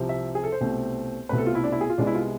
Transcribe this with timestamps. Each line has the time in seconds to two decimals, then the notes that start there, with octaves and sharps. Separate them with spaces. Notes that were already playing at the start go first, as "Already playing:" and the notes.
Already playing: C2 C3 F3
0.09 E5
0.35 G#4
0.44 A4
0.52 C5
0.61 C2 B2 A3 C4
1.29 C2 B2 A3 C4 B4
1.38 A4
1.47 F4
1.55 E4
1.64 D4
1.72 E4
1.81 G#4
1.90 F4
1.98 C2 C3 G#3 B3 D4
2.07 E4
2.15 F4